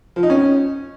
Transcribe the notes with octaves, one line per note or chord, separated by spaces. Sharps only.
F3
D#4
C#4